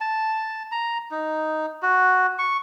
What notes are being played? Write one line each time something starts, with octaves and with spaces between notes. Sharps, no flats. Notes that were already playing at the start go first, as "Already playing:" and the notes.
A5
A#5
D#4
F#4
C#6